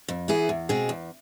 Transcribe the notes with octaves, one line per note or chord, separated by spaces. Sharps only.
F2
E3 B3 E4 G#4
E2
B2 G#3 C4 G#4
E2